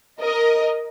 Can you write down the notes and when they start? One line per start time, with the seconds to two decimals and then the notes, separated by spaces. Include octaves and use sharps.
0.20 A#4 D#5